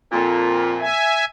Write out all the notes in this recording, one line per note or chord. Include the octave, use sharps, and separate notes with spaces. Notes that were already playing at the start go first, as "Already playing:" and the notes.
F2 A#2
E5 G#5